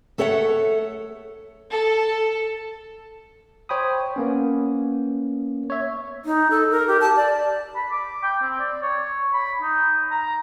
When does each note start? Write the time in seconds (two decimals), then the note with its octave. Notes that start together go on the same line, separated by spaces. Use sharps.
0.18 A3 A4 C#5 E5 F#5
1.70 A4
3.69 C5 C#5 G5 B5 D#6
4.16 A#3 B3 C#4
5.70 C#5 E5
6.25 D#4
6.50 A4
6.70 A#4
6.87 G4
7.00 A5
7.16 D5
7.76 B5
7.91 D6
8.23 G5
8.41 C4
8.59 D5
8.82 C#5
9.33 B5
9.62 D#4
10.11 A#5